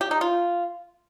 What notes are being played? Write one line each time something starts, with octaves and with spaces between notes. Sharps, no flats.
G4
D#4
F4